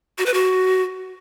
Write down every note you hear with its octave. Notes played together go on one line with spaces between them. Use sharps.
F#4
B4
F#4